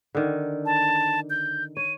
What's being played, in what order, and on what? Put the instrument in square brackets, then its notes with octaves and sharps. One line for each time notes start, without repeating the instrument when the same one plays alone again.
[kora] D3 D#3
[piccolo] A5
G6
[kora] C#5 [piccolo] D#7